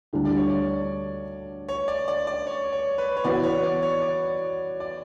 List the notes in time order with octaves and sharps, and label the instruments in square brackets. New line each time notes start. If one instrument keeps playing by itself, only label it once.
[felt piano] D2 D3 G3 D4
[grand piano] D5
C#5
D5
C#5
D5
D5
D5
C#5
C#5
B4
C#5
[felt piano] E3 B3 F#4 B4 [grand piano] D5
[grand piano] C#5
D5
C#5
D5
D5